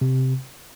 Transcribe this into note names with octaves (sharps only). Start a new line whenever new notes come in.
C3